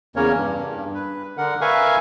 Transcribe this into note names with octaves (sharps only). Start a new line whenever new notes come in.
E2 C#3 A#3 C#4 A#4 C#5
G2
B4
D3 A#4 F#5
A#4 B4 E5 F5 G#5 C#6